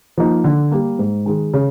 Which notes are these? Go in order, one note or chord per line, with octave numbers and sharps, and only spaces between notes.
F3 A#3 D#4
D3
G3 A#3
G#2
D#3 G#3
C#3